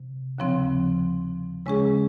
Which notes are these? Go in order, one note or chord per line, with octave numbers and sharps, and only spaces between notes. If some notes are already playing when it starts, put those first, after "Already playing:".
Already playing: C3
D#2 C#3 F3 C4
C#3 G#3 C#4 G#4